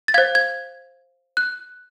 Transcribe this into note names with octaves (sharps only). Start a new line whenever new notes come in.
A6
C5 F5 G#6
G#6
F#6